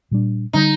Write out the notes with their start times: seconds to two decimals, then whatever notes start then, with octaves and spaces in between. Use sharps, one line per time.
0.11 A#2 G3 D4
0.53 D3 G3 D#4